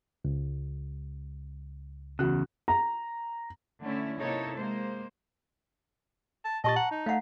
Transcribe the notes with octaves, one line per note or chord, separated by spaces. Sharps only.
C#2
E2 C#3 F#4 F#6
A#5
D3 A3 C#4 E4
C3 A#3 D#4 E4 A4 C#5
G#3 A#3 C5
A5
A#2 G4 D#5 A5 C#6 A6
F#5 A#5
D#4
A3 F5 F#5 A#5